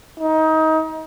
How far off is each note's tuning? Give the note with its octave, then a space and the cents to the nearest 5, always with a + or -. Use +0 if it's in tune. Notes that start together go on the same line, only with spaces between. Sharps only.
D#4 +25